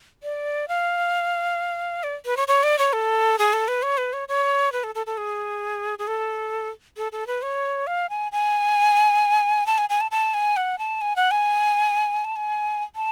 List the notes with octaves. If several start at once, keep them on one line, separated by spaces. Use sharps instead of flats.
D5
F5
D5
B4
C#5
C#5
D5
C#5
A4
G#4
A4
B4
C#5
B4
C#5
C#5
B4
A4
A4
A4
G#4
G#4
A4
A4
A4
B4
C#5
F5
G#5
G#5
A5
G#5
G#5
A5
A5
G#5
F#5
A5
G#5
F#5
G#5
A5
G#5
A5